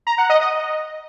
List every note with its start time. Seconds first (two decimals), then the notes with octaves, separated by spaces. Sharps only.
0.07 A#5
0.18 F#5
0.30 D#5
0.41 D#5